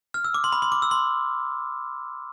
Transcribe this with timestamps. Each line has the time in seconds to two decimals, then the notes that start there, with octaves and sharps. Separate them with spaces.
0.14 F6
0.24 E6
0.34 D6
0.44 C6
0.52 B5
0.62 C6
0.72 D6
0.82 E6
0.91 C6